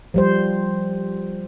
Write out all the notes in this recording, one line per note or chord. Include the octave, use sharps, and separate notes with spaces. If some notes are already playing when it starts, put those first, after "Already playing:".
F3 G3 C5